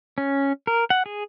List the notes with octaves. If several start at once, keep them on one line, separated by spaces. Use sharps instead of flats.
C#4
A#4
F#5
G#4